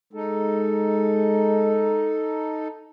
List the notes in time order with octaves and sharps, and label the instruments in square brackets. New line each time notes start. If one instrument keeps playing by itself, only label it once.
[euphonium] G#3 [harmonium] D#4 A4